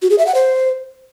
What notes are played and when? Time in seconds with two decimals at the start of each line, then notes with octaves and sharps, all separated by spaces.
0.02 F#4
0.10 G#4
0.18 E5
0.27 F#5
0.35 C5